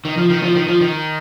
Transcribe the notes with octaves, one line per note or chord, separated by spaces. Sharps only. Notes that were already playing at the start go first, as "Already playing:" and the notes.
D#3
F3
D#3
F3
D#3
F3
D#3